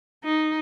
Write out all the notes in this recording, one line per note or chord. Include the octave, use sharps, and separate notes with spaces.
D#4